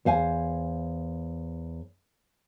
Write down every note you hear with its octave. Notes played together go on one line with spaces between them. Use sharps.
E2 C5 F5 G#5